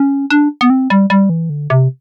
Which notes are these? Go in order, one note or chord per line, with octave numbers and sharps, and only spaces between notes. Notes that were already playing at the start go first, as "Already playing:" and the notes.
Already playing: C#4
D4
B3
C4
G3
G3
E3
D3
C3